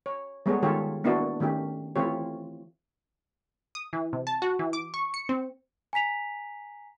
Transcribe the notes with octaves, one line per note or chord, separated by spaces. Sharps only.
C#5
G3 G#3 B3 G#4 A4 C#5
D#3 G#3 F4 G4 A4 C#5
A#3 B3 D4 E4 F#4
D#3 A3 C#4 G4
E3 A3 C4 F4 G4 C#5
D#6
E3
C3
A5
F#4
E3
D6
C#6
C#7
C4
G#5 A#5 B6 F7